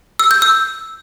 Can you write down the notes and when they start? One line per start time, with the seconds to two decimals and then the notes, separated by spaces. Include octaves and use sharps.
0.19 E6
0.31 G6
0.42 E6